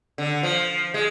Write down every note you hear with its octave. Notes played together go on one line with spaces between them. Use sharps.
D3
F3
G#3